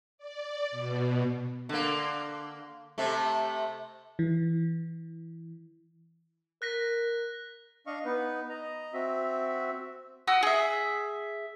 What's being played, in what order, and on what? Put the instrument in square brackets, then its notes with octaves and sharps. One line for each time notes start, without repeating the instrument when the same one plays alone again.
[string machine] D5
B2
[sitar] D3 A#3
C3 A3
[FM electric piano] E3
[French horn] A#4 [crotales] F#6 A#6 B6
[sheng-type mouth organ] D4 D#5 F5 C#6
B3 D#4 B4
D#5 A#5
C4 F#4 E5
[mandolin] F#4 D#6 E6
G#4 E5